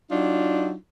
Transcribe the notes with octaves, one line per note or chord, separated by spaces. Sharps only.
F#3 D4 D#4 F4